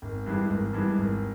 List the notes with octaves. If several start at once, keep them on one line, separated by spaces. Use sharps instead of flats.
G#1
G2 E3 G#3
G#1
G2 E3 G#3
G#1